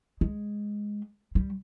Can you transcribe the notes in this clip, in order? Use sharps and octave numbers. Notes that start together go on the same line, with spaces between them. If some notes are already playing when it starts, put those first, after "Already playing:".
G#3
G3